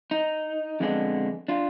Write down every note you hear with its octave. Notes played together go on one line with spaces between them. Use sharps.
D#4
F2 D3 G#3 B3 D4
D4 F4